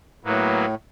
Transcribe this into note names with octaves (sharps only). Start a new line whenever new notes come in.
A2 F#3 A#3 B3